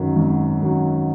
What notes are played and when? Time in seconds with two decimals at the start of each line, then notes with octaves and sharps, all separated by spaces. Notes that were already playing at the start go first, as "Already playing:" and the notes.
Already playing: G#1 F#2 D#3 F#3
0.16 G#1
0.62 F#2 D#3 F#3